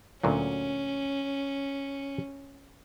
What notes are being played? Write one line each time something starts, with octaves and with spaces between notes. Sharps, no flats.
D2 A#2 F#3 C#4